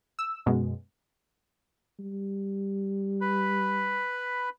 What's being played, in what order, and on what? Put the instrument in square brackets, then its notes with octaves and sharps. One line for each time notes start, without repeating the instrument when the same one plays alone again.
[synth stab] E6
F#2 B2 G#3
[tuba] G3
[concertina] B4 B5